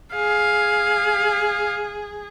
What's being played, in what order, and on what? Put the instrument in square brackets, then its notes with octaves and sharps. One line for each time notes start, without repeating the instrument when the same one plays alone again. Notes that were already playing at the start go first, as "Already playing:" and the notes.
[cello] G#4 [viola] F5